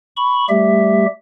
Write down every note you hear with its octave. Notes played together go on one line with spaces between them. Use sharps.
B5 C#6
G3 A3 G4 E5